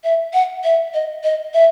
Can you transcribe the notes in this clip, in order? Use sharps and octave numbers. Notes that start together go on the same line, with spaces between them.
E5
F#5
E5
D#5
D#5
E5